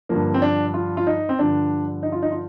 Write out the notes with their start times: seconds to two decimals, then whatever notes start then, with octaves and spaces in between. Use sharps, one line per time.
0.09 G2 D3 F3 A#3
0.34 C4
0.42 D4
0.74 F4
0.97 F4
1.07 D#4
1.29 C4
1.39 G2 D3 F3 D4
2.03 D#4
2.12 F4
2.22 D#4
2.31 F4